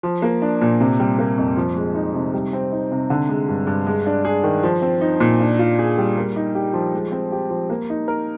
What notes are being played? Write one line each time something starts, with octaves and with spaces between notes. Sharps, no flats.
F3
A#3
D4
A#2
C3
G3
A#3
F2
F3
G#3
D#4
C3
G3
C4
D#4
C3
D3
G#3
G2
G2
G#3
D4
G#4
D#3
F3
C4
D#4
A#2
D4
F4
G#4
G3
A#3
D#4
G4
F3
G#3
C4
G4
F3
A#3
D#4
A#4